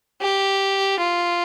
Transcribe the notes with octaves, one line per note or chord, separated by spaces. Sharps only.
G4
F4